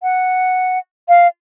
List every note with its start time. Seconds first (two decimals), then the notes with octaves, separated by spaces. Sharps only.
0.03 F#5
1.09 F5